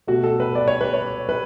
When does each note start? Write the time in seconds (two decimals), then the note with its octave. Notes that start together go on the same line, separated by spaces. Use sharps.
0.07 B2 A3 F#4
0.24 A4
0.40 B4
0.55 D5
0.68 C#5
0.81 B4
0.94 C#5
1.29 B4